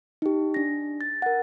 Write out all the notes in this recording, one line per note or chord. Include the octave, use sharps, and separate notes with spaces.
D#4 G4
D4 A#6
A6
A#4 F#5